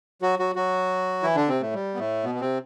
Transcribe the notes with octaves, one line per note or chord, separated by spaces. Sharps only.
F#3 F#4
F#3 F#4
F#3 F#4
E3 E4
D3 D4
C3 C4
A2 A3
G3
B3
A2 A3
B2 B3
B3
C3 C4